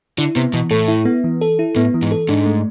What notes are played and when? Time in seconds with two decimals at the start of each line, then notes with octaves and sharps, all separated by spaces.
0.18 D3 E4
0.36 C3 B3
0.53 B2 E3
0.71 A2 A4
0.88 E4
1.05 B3
1.24 E3
1.41 A4
1.59 E4
1.76 A2 B3
1.94 E3
2.02 G#2
2.12 A4
2.28 G#2 D4
2.46 A3